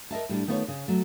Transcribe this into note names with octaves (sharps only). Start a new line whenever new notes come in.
A#4 D#5 E5 A5
A2 G3 D4
D#3 A3 B3 F4 B4 C#5
C#3
F#3 A3